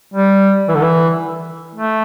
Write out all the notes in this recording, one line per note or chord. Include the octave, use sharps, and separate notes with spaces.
G3
E3
D3
E3
A3